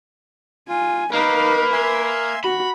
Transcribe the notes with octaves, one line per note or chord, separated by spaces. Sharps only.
F4 G#5
A#3 D#4 A#4 B4 F5
E5 G#5 C6
F#4 B5